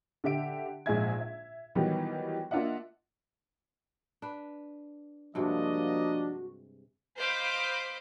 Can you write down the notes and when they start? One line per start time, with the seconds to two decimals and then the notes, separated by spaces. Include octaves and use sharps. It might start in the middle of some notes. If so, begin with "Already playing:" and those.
0.24 D3 G4 E5 D7
0.86 A#1 G#2 D#4 G#4 E5 G#6
1.21 E5
1.75 D#3 E3 F#3 G3 B3 D#4
2.51 A#3 D4 F4 D#5 E5 F#5
4.22 D4 B4
5.35 G2 C3 F3 G#3 A#3 D4 F#4 D#5
7.18 C5 D#5 F5 B5 D6 G6